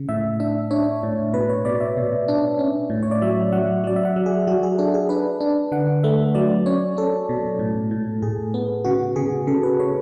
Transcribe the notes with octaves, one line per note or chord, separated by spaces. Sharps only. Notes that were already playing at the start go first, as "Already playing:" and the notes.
Already playing: C#3
A2 E5
D4 E5
D4 C#5
A2
B2 B4
C#5
B2 D5
E5
B2
D4
C#4
A2
C#5
D5
F#3 E5
F#3 F#5
F#3 D5
E5
F#5
F#3
G#4
F#3 F#4
G#4
D4 A4
G#4
D4 B4
D4
D3 F#5
A3 E5
F#3 D5
C#4 C#5
C#4 A4
B2
A2
A2
A2 G#4
B3
C#3 F#4
C#3 G#4
C#3 A4
B4
C#3 C#5